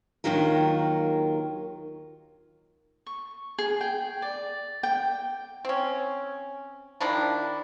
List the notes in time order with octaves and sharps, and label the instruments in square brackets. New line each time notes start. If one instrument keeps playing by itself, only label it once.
[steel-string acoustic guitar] D#2 A2 D#3 F#3 F4 A#4
[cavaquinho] C#6
G#4
G5
D5
G5
[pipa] C4 C#4
D#3 F3 D4 E4